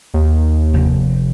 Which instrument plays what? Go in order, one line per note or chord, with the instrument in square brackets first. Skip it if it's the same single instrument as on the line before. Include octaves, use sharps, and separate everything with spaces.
[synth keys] D#2
[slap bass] F1